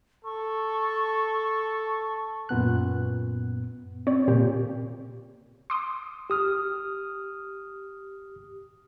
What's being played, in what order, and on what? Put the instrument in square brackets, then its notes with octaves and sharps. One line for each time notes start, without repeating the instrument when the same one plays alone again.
[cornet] A4 [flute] C#6
[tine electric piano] F#2 A#2 B3 F#6
[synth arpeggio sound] C4 C#5 D5
A#2 C#3 C4 G4
C6 D6 D#6
[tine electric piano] G4 D#6 F6